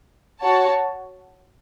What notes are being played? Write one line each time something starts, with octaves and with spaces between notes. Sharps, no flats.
F#4 C#5 A5